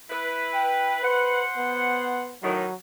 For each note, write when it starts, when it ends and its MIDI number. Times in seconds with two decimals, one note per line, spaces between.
0.10 1.02 64
0.10 1.02 71
0.54 0.96 79
1.03 1.43 71
1.03 2.31 72
1.03 2.31 78
1.58 2.36 59
2.43 2.66 45
2.43 2.66 51
2.43 2.74 54